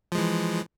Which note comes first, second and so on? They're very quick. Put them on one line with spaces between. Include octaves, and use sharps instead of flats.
F3 G#3 E3